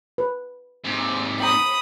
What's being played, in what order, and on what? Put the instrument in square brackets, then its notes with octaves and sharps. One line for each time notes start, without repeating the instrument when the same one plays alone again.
[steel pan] B4
[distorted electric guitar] G#2 C3
[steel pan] G5 A#5 [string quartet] B5 D#6